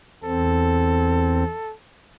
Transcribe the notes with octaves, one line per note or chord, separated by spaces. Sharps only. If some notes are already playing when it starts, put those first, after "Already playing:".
E2 C4 A4